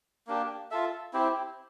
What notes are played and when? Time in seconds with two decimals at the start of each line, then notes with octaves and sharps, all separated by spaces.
0.27 A#3 D4 G4
0.71 F4 A4 E5
1.13 C4 E4 G4